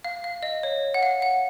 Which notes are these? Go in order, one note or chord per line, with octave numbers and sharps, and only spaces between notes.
F5
F5
D#5
C#5
F#5
F5
F#5